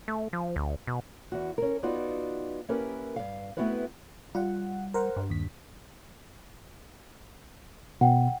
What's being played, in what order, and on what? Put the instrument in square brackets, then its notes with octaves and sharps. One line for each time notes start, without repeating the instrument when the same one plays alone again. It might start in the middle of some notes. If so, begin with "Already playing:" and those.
[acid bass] A3
F3
D2
B2
[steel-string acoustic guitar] E2 F#4
C#4 A#4
B3 D#4 F4 F#4 D5
A#3 C#4 E4 G4 A#4 B4
G2 F5
A3 B3 C4 E4 F#4 B4
[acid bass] G3 [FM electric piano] F4 F#5
[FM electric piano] A#4 C5 F#5
[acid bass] G2
[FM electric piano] D#2 B6
[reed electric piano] B2 [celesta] F#5 G5